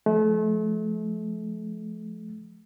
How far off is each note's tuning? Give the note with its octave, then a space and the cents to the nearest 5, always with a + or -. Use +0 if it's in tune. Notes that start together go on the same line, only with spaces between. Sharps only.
F3 +0 A3 -35